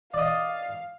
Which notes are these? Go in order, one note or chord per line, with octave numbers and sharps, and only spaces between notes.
D5 D#5 F5